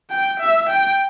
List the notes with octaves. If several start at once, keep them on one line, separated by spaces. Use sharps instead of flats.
G5
E5
G5